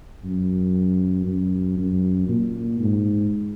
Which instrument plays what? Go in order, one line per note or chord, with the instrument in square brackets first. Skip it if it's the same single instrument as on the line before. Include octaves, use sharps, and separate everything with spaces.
[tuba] F#2
F#2
F#2
A#2
G#2